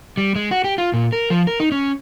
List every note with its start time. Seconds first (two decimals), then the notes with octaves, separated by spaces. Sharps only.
0.17 G3
0.36 G#3
0.51 F#4
0.64 G4
0.78 F4
0.93 A#2
1.12 A#4
1.30 F3
1.47 A#4
1.60 D#4
1.72 C#4